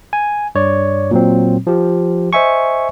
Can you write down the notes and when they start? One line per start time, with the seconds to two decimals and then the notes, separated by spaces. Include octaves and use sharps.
0.13 G#5
0.55 G2 C#5 D5
1.11 A#2 F#3 C4
1.67 F3 G4
2.33 C5 D#5 E5 G#5 C#6